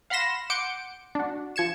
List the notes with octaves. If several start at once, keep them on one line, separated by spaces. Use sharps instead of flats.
F5 F#5 B5 C6 A#6 E7
F#5 C6 D6 G6 C#7 D7
D4 F#4
F3 G#6 C#7 E7